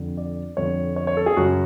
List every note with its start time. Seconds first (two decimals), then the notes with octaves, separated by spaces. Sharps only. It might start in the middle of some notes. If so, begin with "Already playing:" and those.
Already playing: F2 D3
0.17 D5
0.57 F2 D3 C#5
0.96 C#5
1.07 C#5
1.17 A4
1.26 G#4
1.37 F#2 C#3 F#4